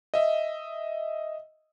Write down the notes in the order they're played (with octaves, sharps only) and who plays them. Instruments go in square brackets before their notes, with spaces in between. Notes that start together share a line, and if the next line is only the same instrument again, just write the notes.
[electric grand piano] D#5 E5